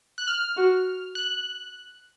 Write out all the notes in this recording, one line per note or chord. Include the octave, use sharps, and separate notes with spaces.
F#6
F6
F#4
F#6